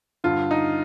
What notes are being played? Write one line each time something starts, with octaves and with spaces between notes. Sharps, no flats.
G2 D3 F4
D#4